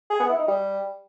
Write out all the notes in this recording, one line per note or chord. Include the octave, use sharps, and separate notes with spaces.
G#4
B3
E4
D#4
G3